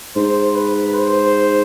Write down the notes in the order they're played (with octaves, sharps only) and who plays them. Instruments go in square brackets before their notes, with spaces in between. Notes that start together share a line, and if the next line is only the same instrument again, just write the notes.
[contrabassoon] G#2 [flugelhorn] C5
[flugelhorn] B4
C5